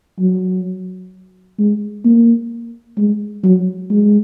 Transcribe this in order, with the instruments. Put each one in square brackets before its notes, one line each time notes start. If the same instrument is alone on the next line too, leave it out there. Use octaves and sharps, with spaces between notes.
[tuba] F#3
G#3
A#3
G#3
F#3
G#3